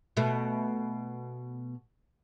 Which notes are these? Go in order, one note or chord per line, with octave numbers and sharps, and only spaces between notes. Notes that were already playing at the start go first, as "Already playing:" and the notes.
B2 A3